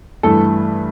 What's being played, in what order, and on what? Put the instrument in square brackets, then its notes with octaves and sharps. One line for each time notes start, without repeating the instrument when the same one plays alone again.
[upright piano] G2 E3 A3 A4